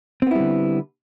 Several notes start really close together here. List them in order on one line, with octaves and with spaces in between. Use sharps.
C4 B3 E4 G3 D3